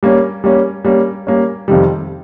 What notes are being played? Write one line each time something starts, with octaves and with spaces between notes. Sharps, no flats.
G3 A#3 C#4
G3 A#3 C#4
G3 A#3 C#4
G3 A#3 C#4
F2 C3 D#3 G3